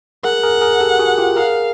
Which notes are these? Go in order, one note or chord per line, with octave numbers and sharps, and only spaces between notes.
G#4 A#4 F#5
G#4 A#4
G#4 A#4
G4 A4
F#4 G#4
F4 G4
G#4 A#4 F5